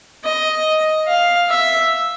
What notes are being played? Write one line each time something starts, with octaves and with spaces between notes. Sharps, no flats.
D#5
F5
E5